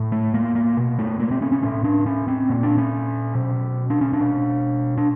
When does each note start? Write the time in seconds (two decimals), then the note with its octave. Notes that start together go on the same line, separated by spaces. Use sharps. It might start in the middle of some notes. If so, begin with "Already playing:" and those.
Already playing: A2
0.12 A3
0.34 A#3
0.55 A#3
0.77 B2
0.99 A3
1.19 A#3
1.31 C4
1.42 C#4
1.52 C#4
1.63 A2 C#4
1.84 D4
2.06 C#4
2.28 C4
2.49 A#2 A#3
2.63 D4
2.78 C#4
3.35 B2
3.90 D4
4.01 C#4
4.13 D4
4.21 B2
4.98 D4